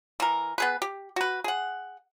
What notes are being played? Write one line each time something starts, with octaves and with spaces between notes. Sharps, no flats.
E3 A#4
B3 G#4 B4
G4
F#4 B4
G#4 F#5